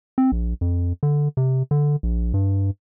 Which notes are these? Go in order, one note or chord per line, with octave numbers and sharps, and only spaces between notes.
C4
A#1
F2
D3
C3
D3
A#1
G2